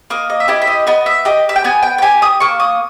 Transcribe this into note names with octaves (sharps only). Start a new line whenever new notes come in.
A#3 D#5
D#5
E5
E4 G4 D#5
E5
D#5
B3 D#5
E5
G4 D#5
E5
G5
B3 G#5
G5
G5
G4 G#5
D#6
A#3 C#6
D#6